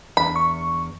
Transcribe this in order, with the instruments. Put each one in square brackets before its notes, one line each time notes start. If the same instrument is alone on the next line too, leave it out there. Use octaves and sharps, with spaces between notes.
[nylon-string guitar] E2 D4 [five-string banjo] B5
[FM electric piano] C#6